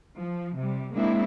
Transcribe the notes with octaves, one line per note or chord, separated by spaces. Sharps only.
F3
C3 G3
G#3 A#3 C4 D4 E4